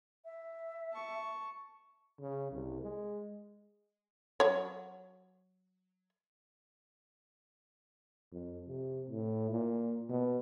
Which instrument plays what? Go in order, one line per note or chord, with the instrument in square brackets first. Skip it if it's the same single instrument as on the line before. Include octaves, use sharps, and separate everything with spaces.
[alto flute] E5
[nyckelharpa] A5 C#6
[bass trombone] C#3
C2
G#3
[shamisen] F#3 C#5
[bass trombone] F2
C3
A2
A#2
B2